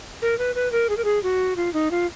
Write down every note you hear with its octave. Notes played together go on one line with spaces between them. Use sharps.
A#4
B4
B4
A#4
G#4
A#4
G#4
F#4
F4
D#4
F4